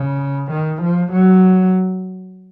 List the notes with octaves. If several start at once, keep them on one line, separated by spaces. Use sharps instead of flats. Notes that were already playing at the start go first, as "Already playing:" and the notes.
Already playing: C#3
D#3
F3
F#3